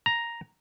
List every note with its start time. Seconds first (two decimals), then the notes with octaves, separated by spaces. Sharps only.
0.06 A#5